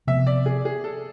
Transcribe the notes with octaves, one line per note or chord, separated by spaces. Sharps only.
C3 F3 B3 E5
D5
G#4
G#4
A4